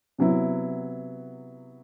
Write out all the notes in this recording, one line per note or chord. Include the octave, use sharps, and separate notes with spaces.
C3 F#3 B3 E4